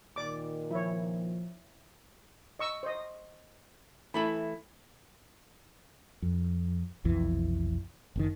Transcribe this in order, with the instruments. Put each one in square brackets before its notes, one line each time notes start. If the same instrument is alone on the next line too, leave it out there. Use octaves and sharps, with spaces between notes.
[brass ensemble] A#2 D#3 [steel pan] D5 D6
[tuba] F3 [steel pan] E4 C#5
[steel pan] D#5 C#6 E6
C5 D#5
[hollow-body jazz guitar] E3 A3 E4 [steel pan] B5
[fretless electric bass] F2
F1 B1 F2 E3
F#1 B2 D#3